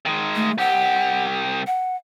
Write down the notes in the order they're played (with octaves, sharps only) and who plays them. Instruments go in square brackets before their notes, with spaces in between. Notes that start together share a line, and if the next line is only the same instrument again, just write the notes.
[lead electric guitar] D#3 G#3
[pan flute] A3
[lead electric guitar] C2 G4 [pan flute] F#5
[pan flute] F#5